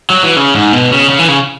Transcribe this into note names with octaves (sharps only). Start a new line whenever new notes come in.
F#3
E3
C#3
G#2
B2
C#3
C#3
E3
C#3